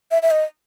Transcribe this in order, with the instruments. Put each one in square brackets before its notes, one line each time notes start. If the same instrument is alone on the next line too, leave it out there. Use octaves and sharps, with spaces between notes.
[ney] E5
E5
D#5